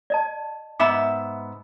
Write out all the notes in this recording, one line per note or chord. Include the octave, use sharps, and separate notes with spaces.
D5 D#5 A5
G#2 B3 E5 D6